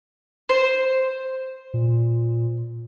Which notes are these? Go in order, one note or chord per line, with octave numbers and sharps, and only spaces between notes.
C5
A#2